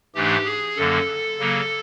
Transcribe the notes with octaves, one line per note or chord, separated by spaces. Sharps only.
G#2 E3 A3 D4 G4
G#4
F#2 D3 F#3 A#3 A4
C#3 F#3 A#3